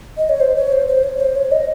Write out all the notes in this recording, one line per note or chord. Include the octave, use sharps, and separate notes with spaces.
D#5
C#5
C5
C#5
C5
C5
C#5
C5
C#5
D#5